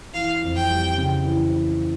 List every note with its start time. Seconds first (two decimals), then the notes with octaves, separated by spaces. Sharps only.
0.14 E3 F5
0.42 F2
0.56 G5
0.70 G3
0.97 C#3
1.25 E3